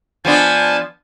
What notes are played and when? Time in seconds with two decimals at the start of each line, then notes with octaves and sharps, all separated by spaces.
0.25 F3 B3 D4 G#5 A5